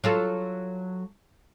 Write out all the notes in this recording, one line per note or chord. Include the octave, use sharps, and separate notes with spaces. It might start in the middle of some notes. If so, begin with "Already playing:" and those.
F#3 F4 A4